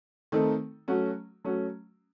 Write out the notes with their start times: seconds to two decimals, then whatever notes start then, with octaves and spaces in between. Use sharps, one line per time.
0.32 D#3 A3 C4 D#4 A4
0.88 F#3 A3 C#4 F#4
1.44 F#3 A3 C#4 F#4